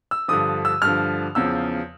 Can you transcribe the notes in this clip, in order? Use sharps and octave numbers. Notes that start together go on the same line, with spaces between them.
E6
G2 D3 F3 D#6
E6
G2 D3 F3 F6
E2 C#3 F3 E6